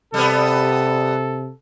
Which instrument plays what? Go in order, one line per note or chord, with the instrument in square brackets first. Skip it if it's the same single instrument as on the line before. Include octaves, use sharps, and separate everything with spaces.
[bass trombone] C3 [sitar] G3 B3 [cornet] A4